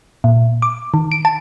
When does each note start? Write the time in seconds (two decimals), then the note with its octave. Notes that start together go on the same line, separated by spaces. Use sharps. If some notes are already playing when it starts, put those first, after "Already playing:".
0.24 A#2
0.62 D6
0.94 D#3
1.12 D7
1.25 A5